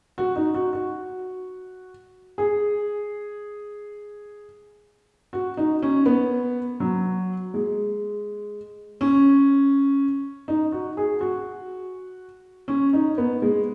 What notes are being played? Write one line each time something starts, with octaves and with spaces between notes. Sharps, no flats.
F#4
D#4
F#4
F#4
G#4
F#4
D#4
C#4
B3
F#3
G#3
C#4
D#4
F#4
G#4
F#4
C#4
D#4
B3
G#3